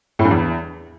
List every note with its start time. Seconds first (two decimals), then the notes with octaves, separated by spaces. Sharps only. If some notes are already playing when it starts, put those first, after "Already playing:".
0.19 A2
0.25 G2
0.31 E2